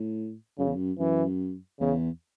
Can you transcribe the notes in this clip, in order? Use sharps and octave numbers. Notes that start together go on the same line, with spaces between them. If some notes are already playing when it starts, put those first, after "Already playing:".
Already playing: A2
F#2 C#3
E2
F#2
F#2 E3
E2 C#3